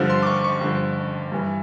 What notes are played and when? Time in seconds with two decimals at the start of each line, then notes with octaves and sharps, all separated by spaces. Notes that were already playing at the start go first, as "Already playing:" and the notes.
Already playing: G2 D3 F3
0.10 C6
0.23 D6
0.27 C#6
0.44 C#6
0.61 G2 D3 F3
1.32 G2 E3